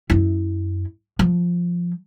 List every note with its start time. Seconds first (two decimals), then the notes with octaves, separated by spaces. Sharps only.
0.10 F#2 E4
1.19 F3